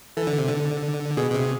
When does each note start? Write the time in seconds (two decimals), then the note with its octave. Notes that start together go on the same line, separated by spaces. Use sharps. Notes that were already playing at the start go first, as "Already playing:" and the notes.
0.17 E3 A4
0.27 D3
0.39 C3
0.49 D3
1.17 B2 G#4
1.31 B2
1.34 C3